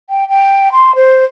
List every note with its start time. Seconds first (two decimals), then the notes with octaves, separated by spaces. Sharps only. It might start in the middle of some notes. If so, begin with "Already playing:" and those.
0.10 G5
0.29 G5
0.72 C6
0.95 C5